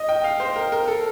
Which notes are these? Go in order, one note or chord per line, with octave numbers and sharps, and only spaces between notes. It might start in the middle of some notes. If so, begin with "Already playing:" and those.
Already playing: D#5
G5
F5
C5
A#4
A#4
A4